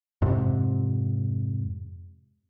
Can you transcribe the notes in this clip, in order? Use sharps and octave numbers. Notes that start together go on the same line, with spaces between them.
F2 G#2 C3